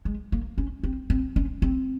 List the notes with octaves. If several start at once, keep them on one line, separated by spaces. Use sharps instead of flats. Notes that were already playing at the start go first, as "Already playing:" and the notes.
G#3
A#3
C#4
C4
C4
C#4
C4